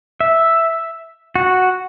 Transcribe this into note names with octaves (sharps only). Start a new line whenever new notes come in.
E5
F#4